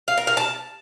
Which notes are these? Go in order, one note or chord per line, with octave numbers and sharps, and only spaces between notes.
F5
A#4
F5
A5